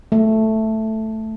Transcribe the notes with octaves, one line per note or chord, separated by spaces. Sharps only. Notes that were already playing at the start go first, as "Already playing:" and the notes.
A3